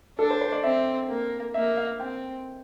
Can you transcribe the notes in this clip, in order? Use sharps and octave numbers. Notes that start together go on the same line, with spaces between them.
D4 A4
C5
C5
D5
C4 E5
A#3
A#3 E5
F5
C4 G5